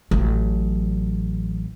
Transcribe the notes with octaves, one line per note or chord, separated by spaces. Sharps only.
A1 F#3